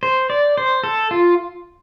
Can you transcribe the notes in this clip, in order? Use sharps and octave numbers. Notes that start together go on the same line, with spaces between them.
C5
D5
C5
A4
F4